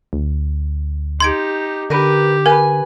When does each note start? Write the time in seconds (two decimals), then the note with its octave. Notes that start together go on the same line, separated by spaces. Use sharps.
0.13 D2
1.20 D#4 G4 C6 G#6 D7
1.90 D3 G4 A#4 B4
2.46 A#4 B4 G#5